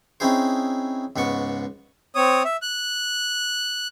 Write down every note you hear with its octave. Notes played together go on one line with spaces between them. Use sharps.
C4 C#4 D#4 E4 G#4 C5
C#2 G#2 B3 C#6
C4 C#5 D#6
E5
F#6